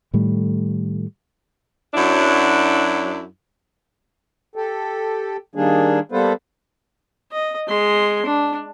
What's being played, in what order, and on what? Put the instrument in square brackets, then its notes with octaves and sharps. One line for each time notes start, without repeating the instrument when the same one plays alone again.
[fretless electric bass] A2 D#3 G3 A3
[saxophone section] F#2 F#3 D4 E4
[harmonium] G4 A4
D#3 G3 A#3 D4 G#4
G3 A#3 B3 A4 B4 C5
[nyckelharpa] D#5
G#3 C6
D4